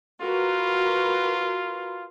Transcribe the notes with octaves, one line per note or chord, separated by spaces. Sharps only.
F4 F#4 A#4 B4